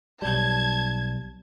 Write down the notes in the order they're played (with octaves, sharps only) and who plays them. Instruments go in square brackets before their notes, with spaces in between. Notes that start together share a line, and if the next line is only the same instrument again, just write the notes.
[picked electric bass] B1 G3 [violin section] A5 G#6